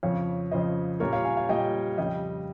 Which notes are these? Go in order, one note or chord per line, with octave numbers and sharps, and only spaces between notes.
F2 C#3 F3 C#5 F5
F2 C#3 F3 C5 D#5
A#2 G3 A#4 C#5
C#5 F5
F5 G#5
F5 G#5
A#2 G3 D#5 G5
F2 C#3 G3 D#5 G5